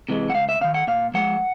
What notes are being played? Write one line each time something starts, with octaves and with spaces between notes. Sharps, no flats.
C3 E3 G#3
F#5
C#2 F5
E5
C3 D#3 F5
F#5
A#2 F5
F3 G#3 F#5